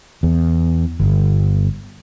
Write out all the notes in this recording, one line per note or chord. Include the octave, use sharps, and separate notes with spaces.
E2
G1